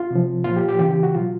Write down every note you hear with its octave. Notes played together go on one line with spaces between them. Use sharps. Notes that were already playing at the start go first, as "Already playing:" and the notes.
Already playing: F4
C3 F3
A#2 F3 F4
G4
G4
C#3 E3 G4
G4
F#4
B2 F#3 F4